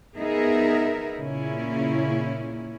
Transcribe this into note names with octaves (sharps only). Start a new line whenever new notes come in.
B3 D#4 G#4 A#4 E5
A#2 C#3 A#3 C#4 E4